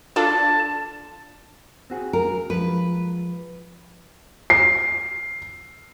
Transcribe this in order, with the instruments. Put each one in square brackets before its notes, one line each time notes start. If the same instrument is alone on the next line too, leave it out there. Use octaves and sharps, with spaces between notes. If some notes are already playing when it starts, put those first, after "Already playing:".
[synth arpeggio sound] D4 F4 A4 [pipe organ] A5
[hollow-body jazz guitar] C4 F#4 G#4
[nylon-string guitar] A#4
[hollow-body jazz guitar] F3 G#3 [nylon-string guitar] B4
[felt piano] C7